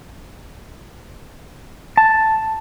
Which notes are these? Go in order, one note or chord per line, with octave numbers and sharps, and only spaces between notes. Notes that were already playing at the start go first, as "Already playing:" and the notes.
A5